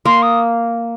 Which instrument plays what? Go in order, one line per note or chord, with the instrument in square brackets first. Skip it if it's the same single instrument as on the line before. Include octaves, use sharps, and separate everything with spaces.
[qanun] A#3 [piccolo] C6
[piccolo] D#6